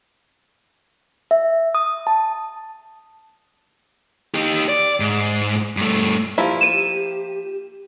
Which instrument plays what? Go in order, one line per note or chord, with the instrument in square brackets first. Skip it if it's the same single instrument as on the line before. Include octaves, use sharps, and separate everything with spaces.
[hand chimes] E5
D#6
A5
[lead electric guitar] D#4 G4
D5
G#2
G2 A3
[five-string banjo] F3 A#3 E4 [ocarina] G4
[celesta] D#7 E7